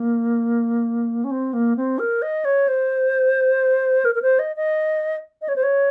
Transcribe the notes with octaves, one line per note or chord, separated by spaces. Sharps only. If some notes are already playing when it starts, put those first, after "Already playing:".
Already playing: A#3
C#4
C4
A#3
C4
A#4
D#5
C#5
C5
A#4
A#4
C5
D#5
D#5
D#5
C#5
C5
C#5